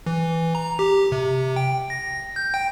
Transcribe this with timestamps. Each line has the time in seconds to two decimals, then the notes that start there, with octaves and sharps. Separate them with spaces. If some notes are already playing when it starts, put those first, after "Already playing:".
0.06 E3
0.55 A#5
0.79 G4
1.12 C3
1.56 G5
1.90 A#6
2.36 G6
2.54 G5